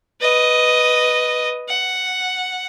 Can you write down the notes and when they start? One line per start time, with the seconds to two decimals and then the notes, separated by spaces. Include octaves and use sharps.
0.21 B4 D#5
1.69 F#5